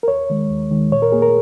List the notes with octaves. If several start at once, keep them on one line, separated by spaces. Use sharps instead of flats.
A#4
D#2 C#5
D#3 G#3
D#2
D#3 G#3
A#2 C#5
A#4
A#3 G#4
A#4